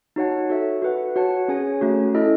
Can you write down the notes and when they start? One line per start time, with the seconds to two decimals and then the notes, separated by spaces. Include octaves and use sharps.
0.16 D#4 F#4 C#5 F#5 A5
0.50 F#4 A4 E5
0.82 F#4 B4 F#5
1.16 F#4 C#5 F#5 A5
1.48 C#4 G#4 C#5 G#5
1.81 A3 C#4 F#4
2.15 E4 A4 D#5